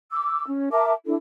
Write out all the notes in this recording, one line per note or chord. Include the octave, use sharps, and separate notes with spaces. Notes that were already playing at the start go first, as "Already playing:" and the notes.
D6 E6
C#4
A#4 E5 A5 D6
D4 E4 A4